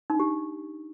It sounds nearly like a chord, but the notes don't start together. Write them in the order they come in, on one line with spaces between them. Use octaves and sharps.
D#4 D4 G4